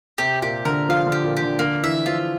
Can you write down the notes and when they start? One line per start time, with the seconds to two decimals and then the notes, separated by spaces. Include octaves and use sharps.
0.18 C3 G4
0.42 A#2 G4
0.65 D3 A#4
0.89 F3 F5
1.06 D3
1.12 G4
1.24 A#2
1.37 G4
1.42 D3
1.59 D3 A#3
1.83 E3 E5
2.06 F3 F4